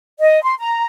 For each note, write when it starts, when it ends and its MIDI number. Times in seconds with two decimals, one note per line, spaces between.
0.20 0.42 75
0.42 0.55 84
0.59 0.85 82